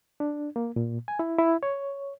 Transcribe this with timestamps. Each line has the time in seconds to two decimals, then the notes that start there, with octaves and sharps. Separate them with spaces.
0.20 D4
0.56 A#3
0.76 A#2
1.08 G#5
1.19 E4
1.38 E4
1.63 C#5